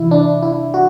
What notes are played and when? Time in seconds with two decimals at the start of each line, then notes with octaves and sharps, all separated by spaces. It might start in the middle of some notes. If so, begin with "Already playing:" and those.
Already playing: C3 E3 E4
0.11 D4
0.43 E4
0.74 F#4